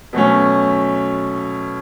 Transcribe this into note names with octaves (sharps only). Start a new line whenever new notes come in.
B2 F#3 A3 C#4